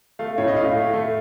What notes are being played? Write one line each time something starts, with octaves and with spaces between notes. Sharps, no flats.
A3 F5
A2 C#5
D#5
A2 F5
A3
A3